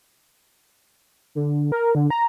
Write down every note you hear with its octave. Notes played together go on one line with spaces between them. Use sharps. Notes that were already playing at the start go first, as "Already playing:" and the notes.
D3
A#4
D3
A#5